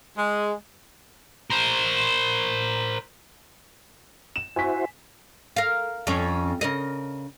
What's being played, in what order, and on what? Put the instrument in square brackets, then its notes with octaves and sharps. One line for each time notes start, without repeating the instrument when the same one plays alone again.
[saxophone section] G#3
[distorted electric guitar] A#4 C5
[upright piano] E7
[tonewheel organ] E4 F#4 C5 [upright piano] G#5 C#6 B6
[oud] A#4 F5
F2 C#4
C#3 A#4 D#5